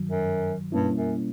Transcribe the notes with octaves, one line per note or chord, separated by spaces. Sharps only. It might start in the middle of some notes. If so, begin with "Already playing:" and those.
Already playing: G2 D#3 F#3
F#2
G2 B2 G3 A#3 C#4 E4
F#2